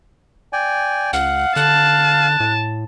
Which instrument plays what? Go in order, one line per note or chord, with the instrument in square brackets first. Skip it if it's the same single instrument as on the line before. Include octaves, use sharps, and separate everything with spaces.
[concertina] D5 G5 G#5
[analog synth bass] C#2 [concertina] F5 [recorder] F#5
[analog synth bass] D3 [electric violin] A5 [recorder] F#6
[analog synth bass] A2